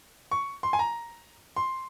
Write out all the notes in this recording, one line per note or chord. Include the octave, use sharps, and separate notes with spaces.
C#6
C6
G#5
A#5
C6